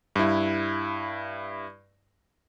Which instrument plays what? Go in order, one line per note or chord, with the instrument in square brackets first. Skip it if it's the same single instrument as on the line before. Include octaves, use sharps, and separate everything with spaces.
[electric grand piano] G2 E4